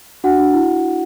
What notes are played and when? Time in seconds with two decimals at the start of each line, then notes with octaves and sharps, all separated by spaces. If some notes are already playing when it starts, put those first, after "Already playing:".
0.24 D4 F#4 F#5
0.39 D4
0.53 E4